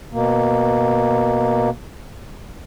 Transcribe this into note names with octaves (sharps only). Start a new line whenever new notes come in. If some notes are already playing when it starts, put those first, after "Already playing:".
B2 A#3